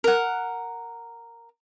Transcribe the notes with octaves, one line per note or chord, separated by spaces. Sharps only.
A#4 F#5